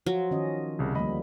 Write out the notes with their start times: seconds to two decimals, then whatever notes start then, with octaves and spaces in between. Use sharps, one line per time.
0.06 F3 F#3 F4 F#4
0.31 D#3 C#4 D#5
0.79 C2 C#3
0.95 D2 F3 G3 A#3 D#5 B5